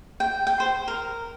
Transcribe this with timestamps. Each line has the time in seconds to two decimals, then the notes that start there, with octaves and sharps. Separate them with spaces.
0.20 G5
0.47 G5
0.60 C5
0.88 A#4